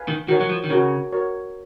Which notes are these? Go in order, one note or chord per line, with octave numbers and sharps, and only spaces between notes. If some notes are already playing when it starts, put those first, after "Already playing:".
Already playing: B4 F5 G#5
D#3
D#3 F#4 A#4 C#5
F#3
F3
D#3
C#3 F#4 A#4 C#5
F#4 A#4 C#5